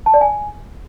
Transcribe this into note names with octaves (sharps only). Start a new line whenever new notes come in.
A5
D5
G#5